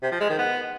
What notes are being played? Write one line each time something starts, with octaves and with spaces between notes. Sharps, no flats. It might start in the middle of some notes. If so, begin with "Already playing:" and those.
C3
F3
G#3
D#3
B3